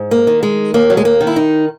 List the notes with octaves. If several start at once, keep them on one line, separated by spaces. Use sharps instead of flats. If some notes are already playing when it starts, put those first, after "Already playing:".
Already playing: G#2
A#3
D#3
G#3
D#2 A#3
F#3
G#3
A#3
D#3
E4
D#4